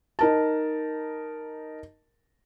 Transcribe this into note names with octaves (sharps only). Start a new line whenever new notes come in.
D#4 A#4 A5